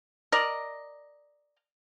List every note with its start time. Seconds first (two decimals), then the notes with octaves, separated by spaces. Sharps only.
0.32 A#4 D5 D#5